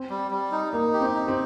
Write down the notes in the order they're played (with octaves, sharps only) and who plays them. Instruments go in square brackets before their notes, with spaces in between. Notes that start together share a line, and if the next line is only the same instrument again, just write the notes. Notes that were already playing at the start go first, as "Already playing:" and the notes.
Already playing: [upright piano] C4
[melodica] G3
G3
D#4
[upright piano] A#3 [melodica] D#4
[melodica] G4
[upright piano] C4
[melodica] D#4
[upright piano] C4